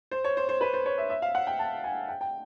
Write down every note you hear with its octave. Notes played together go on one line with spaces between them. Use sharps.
C5
C#5
C5
C5
B4
C5
C#5
E5
E5
F5
F#5
G5
A5
G#5
G5
G5